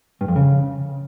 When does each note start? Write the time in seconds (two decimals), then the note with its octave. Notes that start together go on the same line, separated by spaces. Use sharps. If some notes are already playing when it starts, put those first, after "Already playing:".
0.21 G2
0.28 F2
0.36 C#3